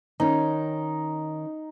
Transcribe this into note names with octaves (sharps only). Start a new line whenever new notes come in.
D#3 C#4 D#4